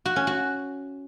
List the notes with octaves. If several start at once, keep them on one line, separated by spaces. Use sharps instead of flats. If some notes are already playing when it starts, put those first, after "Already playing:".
F#4
C#4
F#4